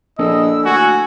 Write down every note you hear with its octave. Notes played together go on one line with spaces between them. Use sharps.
A#1 D3 E4 D#5 E6
D2 F#4 G#5